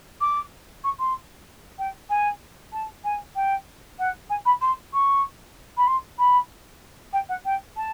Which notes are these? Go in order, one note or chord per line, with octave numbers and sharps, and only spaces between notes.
D6
C#6
C6
G5
G#5
A5
G#5
G5
F#5
G#5
B5
C6
C#6
B5
C6
B5
G5
F#5
G5
A5